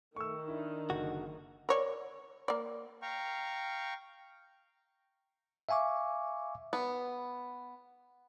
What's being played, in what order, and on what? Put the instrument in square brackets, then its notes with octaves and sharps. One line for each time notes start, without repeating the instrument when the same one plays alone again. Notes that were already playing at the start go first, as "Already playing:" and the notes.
[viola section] D#3 [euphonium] A3 [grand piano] C#6 E6
[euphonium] D4 [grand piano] E4
[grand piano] F#1 [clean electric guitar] D3 F#4
[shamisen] A#4 C#5 D5
A#3 D5
[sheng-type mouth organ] F5 G5 A#5 C#6
[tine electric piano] E5 F5 G#5 C#6 D6
[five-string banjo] B3